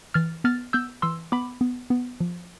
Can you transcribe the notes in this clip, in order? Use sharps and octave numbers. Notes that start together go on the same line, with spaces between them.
E3 F6 A6
B3 F6 A6
B3 E6 G6
E3 C6 E6
B3 B5 D6
B3
B3
F3